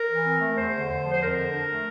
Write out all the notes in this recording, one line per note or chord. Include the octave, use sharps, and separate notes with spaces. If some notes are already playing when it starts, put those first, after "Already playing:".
Already playing: A#4
E3
C4
A3
E2 C5
D3
E2
F3
C5
F2 A#4
D3
D4
A3